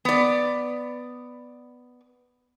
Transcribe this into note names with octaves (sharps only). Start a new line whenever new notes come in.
B3 D5